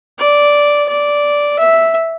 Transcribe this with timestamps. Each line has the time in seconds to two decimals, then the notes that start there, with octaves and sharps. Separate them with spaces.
0.18 D5
0.89 D5
1.59 E5